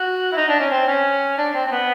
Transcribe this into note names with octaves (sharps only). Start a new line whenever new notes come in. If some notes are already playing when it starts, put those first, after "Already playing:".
Already playing: F#4
E4
D#4
D4
C#4
C4
C#4
D4
C4
C4
B3